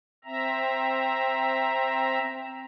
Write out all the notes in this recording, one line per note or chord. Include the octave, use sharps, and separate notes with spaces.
C4 E5 A#5